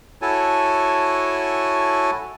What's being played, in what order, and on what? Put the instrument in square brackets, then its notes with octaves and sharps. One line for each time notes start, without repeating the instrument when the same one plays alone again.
[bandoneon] E4 F#4 A4 C#5 G#5 A5